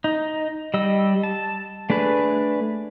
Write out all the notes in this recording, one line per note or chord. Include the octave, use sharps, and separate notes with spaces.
D#4
G3 D#5 E6
A5
A3 D4 G#4 B4